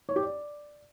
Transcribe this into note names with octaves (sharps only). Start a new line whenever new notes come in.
C#5
G4
D5